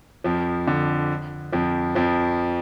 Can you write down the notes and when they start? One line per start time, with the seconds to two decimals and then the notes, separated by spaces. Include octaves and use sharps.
0.24 F2 F3
0.67 D3
1.52 F2 F3
1.95 F2 F3